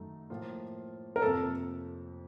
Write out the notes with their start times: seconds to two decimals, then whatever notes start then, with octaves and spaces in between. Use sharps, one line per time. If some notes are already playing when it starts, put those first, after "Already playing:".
Already playing: F#2 D#3 A3 D#4
0.30 A2 F3 A#3 F4
1.16 A#4
1.22 F2 C3 F3 A#3 A4